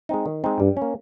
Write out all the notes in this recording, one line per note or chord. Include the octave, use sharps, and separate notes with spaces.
G#3 C4 D#4
D#3
G#3 C4 D#4
G2 G3
C#4
A#3